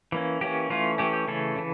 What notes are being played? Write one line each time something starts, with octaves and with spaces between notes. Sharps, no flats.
E3 A#3 C#4
E3 A#3 C#4 G4
E3 A3 C#4 F4
E3 A3 C#4 G4
G4
C#3 E3 A3 C#4 A4
C#3 E3